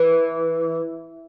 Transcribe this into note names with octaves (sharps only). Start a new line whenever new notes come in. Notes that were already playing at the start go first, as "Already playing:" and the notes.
Already playing: E3